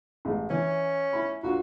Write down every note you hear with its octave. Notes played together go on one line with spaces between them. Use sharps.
A1 G#3
E3 C#4
E4 B5
A#1 F#4